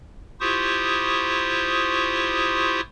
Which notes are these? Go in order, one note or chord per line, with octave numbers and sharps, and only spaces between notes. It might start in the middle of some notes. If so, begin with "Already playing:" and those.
E4 F4 G4 C5 C#6 D#6